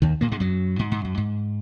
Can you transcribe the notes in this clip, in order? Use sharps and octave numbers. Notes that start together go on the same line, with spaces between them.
D#2 D#3
A#2 A#3
G#2 G#3
F#2 F#3
G#2
G#2
F#2
G#2